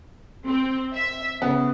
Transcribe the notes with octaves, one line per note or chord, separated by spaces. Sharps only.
C4
E5
C#3 B3